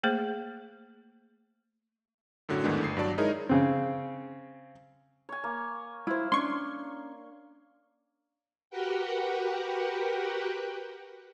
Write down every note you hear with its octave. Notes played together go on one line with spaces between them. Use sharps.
A3 A#3 G#4 C5
F#2 A2 D3 F#3
E2 G#2 D#3 E3 A3 D4
G1 C7
G2 F#3 D5 A5
G#3 D#4 E4 G#4 A#4 C#5
C#3 C4
C#5 G#5
A#3
E4 C5 F5
C#4 D4 C6 C#6
F#4 G4 A#4 B4 F#5 G5